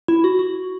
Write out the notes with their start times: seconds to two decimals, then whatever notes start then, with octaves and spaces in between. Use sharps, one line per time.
0.08 E4
0.24 F#4
0.39 F#4